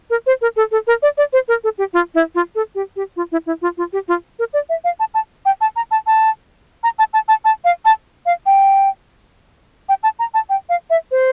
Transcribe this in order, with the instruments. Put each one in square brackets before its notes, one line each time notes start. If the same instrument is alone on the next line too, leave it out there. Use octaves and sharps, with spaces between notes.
[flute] A#4
C5
A#4
A4
A4
A#4
D5
D5
C5
A#4
A4
G4
F4
E4
F4
A4
G4
G4
F4
E4
E4
F4
F4
G4
F4
A#4
D5
E5
F5
A5
A5
G5
A5
A#5
A5
A5
A#5
A5
A5
A5
A5
F5
A5
F5
G5
G5
A5
A#5
A5
G5
F5
E5
C5